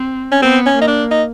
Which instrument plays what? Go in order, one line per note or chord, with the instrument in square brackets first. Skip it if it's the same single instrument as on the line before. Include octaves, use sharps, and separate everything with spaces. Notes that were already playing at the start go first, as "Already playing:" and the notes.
Already playing: [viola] C4
[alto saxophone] C#4
[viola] B3 [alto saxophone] C4
[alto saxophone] C#4
[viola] A#3 [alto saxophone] D#4
[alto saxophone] D4
D#4